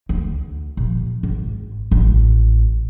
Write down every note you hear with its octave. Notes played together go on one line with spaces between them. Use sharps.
D2
A#1
G#1
A1